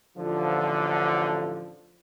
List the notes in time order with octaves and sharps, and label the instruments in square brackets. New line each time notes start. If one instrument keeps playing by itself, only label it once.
[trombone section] A1 D3 [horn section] F3